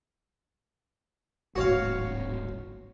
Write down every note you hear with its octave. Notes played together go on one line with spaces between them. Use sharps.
D1 G#1 F#4 C#5 F5